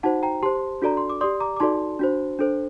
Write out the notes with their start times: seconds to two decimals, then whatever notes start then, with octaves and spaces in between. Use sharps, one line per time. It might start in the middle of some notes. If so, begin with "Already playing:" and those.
0.03 D#4 F#4 C5 F#5 A5
0.23 G5 A#5
0.43 G4 C5 A5 C6
0.82 D4 F#4 A4 D5 A#5
0.97 C6
1.09 D6
1.21 G4 D5 C6 D#6
1.40 A#5 D6
1.56 D6
1.60 D#4 F#4 A4 D5 A5 C6
1.99 D4 F#4 C5
2.39 D4 A4 C5